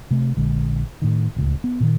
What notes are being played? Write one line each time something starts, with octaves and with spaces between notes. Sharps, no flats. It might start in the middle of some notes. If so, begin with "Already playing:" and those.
C3 A3
A#1 D3 G#3
A2 D#3
D1 C#2 A2
B3
A#2 D#3